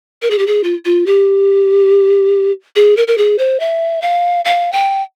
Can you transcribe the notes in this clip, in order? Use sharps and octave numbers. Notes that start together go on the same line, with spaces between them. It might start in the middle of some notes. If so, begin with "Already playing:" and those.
A#4
G#4
G4
G#4
F4
F4
G4
G#4
A#4
A#4
G#4
C5
E5
F5
F5
G5